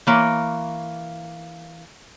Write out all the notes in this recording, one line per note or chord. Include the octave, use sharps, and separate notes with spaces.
E3 A#3 C#5